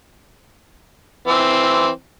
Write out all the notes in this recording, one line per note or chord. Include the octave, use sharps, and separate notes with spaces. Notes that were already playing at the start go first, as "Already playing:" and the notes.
E3 C4